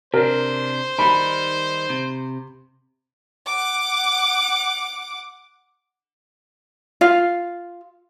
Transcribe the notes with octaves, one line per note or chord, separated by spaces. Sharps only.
C3 D4 A#4 C5
D#3 G3 D#4 B5
C3
F#5 D6
F4 F5